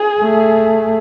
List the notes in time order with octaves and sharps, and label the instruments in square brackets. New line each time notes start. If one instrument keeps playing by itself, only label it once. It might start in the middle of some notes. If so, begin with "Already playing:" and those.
Already playing: [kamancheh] G#4
[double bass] A3